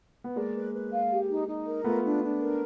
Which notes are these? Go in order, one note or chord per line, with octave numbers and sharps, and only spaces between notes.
B3
G#3 A#3 D5
B4
B4
F5
G4
D#4
D#4
A#4
A3 B3 F4
D4
D4
A#4